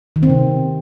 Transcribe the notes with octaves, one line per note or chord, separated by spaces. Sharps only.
D#3
C4
C3